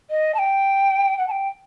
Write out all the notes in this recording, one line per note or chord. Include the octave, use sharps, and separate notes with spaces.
D#5
A5
G5
F#5
A5
G5